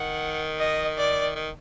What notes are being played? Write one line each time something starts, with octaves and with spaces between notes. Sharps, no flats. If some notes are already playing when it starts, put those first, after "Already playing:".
Already playing: D#3 F#5
D#5
D5
D#3